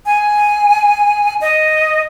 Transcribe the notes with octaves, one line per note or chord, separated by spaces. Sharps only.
G#5
D#5